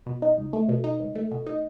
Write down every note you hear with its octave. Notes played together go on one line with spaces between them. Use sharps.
B2
D#4
C#2
A3
B2
D#4
C#2
A3
B2
D#4